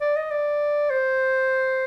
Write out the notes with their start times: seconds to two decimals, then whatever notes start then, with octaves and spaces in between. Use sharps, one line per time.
0.01 D5
0.16 D#5
0.31 D5
0.90 C5